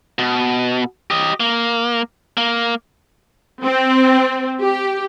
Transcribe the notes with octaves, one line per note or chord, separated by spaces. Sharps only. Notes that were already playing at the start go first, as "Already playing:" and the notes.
B2
G4 D#5
A#3
A#3
C4
G4